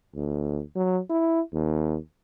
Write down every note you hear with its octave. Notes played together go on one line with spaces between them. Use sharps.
D2
F#3
E4
D#2